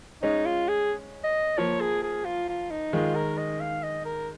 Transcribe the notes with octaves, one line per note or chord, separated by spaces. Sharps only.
G#3 C#4 D#4
F4
G#4
D#5
F3 A#3 C#5
G#4
G#4
F4
F4
D#4
D#3 G#3 F4
A#4
D#5
F5
D#5
A#4